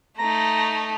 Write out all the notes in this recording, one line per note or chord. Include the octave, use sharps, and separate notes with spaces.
A3 D#4 A#5